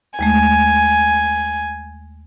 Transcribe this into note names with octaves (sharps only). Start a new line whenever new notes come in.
D#2 G#3 A3 G#5